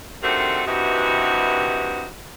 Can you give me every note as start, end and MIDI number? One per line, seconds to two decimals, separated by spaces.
0.22 0.61 48
0.22 0.61 51
0.22 0.61 57
0.22 0.61 60
0.22 0.61 62
0.22 0.61 66
0.67 2.06 43
0.67 2.06 48
0.67 2.06 52
0.67 2.06 63
0.67 2.06 66